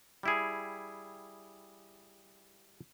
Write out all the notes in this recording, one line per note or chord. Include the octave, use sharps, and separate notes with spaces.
G3 E4 G#4